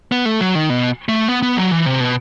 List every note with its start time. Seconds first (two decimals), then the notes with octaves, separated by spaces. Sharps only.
0.12 B3
0.25 A3
0.41 F#3
0.55 D#3
0.70 B2
1.09 A3
1.28 B3
1.42 B3
1.57 F#3
1.72 E3
1.86 C3
2.00 B2